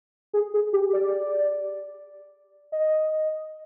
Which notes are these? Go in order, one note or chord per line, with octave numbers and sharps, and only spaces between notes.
G#4
G#4
G4
D5
D#5